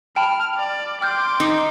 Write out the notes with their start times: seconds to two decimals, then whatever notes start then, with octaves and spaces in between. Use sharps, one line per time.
0.16 G5 A5 B5 F6
0.57 D5
1.01 G5 C6 D6 F6 G6
1.40 D#4